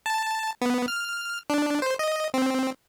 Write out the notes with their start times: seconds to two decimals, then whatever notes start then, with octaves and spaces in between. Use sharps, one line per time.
0.06 A5
0.62 B3
0.88 F6
1.50 D4
1.82 C5
1.99 D#5
2.34 C4